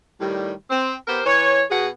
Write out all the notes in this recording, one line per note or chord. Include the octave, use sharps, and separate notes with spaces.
A2 D#3 G3
C4
B3 G4 A#4 C5
E3 B4 C#5
B2 B3 F#4 G#4 F#5